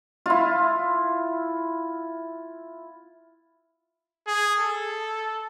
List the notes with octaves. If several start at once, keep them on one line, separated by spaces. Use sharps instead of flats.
E4 F4
G#4
A4